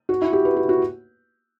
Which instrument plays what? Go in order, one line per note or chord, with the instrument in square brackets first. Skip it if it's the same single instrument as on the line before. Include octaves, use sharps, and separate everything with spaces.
[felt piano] F#4
E4
G4
B4
G4
F#4